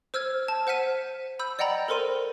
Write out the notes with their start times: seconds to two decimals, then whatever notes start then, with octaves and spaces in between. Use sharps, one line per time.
0.14 C5 E6 F6 G#6
0.48 A5
0.67 C5 F#5 F6 B6 D#7
1.39 B5 E6 G6
1.59 D5 D#5 F#5 G5 A#5 B5
1.88 A4 A#4 C5 C6 D#7